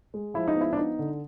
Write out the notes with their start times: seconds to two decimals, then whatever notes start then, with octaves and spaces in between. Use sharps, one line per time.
0.14 G#3
0.34 F3 E4
0.48 D#4
0.56 B3 E4
0.73 D4
0.77 B3 D#4
0.99 D3